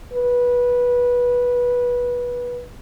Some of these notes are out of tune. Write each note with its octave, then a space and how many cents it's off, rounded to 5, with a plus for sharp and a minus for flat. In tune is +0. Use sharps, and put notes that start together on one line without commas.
B4 -15